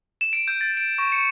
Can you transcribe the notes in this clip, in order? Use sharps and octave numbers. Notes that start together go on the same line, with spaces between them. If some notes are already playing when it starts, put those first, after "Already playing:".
E7
D7
G6
A6
D7
C#6
C#7